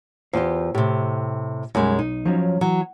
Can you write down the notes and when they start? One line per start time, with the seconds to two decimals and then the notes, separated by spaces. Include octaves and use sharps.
0.33 E2 F4 G4 C5
0.75 A2 C3 G4
1.75 B1 F#2 G3 G#3
1.99 D#4
2.25 F3 F#3 C#4
2.61 E3 F#3